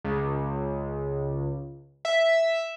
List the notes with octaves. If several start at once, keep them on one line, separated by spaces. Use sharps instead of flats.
C#2
E5